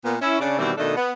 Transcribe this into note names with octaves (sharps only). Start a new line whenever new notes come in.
A#2 B3
C#4 E4
C#3 D4
B2 D#3 E3 G3 C4
B2 D#3 A3 D4 A4 D#5
B3